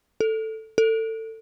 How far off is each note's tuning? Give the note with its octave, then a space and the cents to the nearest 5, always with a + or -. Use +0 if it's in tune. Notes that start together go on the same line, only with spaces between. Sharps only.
A4 +5
A4 +25